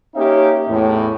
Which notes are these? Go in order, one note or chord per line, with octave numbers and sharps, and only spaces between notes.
A#3 C#4 D#4 G4 C#5 E5
E2 A2